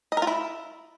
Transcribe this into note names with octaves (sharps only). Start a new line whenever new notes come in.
D#5
A#4
F4
E4